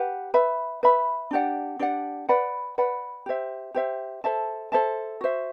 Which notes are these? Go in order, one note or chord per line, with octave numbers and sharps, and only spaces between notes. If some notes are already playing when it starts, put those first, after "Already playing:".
Already playing: G4 B4 F#5
B4 E5 B5
B4 E5 B5
D4 G4 D5 F#5
D4 G4 D5 F#5
B4 D5 F#5 B5
B4 D5 F#5 B5
G4 C5 E5
G4 C5 E5
A4 C5 E5 A5
A4 C5 E5 A5
F#4 C5 E5